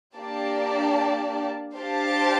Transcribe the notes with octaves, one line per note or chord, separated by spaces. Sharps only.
A#3 D4 G4 D5 A5
D4 G4 C5 F5 A5